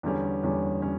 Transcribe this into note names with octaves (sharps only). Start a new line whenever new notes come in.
E2 D3 G3 C#4
E2 D3 G3 C#4
G3 C#4